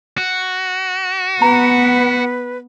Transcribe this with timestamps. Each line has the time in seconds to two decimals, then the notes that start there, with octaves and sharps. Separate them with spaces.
0.18 F#4
1.42 B3 B4 A#5